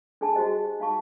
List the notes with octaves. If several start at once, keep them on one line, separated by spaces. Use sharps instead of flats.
D4 G#4 G#5 A5
F#4 G4 C5 D#5
D#4 F5 A5 C#6